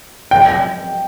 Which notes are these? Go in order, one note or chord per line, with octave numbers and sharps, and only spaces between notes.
G5